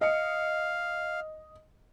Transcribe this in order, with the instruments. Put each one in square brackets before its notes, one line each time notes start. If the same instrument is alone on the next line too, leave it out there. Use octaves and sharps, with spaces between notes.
[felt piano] D#5 C#7 [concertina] F5